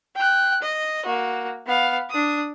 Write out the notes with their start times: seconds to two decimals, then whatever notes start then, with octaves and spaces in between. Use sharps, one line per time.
0.16 G5 F#6
0.62 D#5
1.05 A#3 F#4
1.66 B3 F5
2.10 D4 D#6